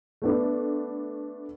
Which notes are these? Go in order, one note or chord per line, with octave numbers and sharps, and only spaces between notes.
A3 B3 D4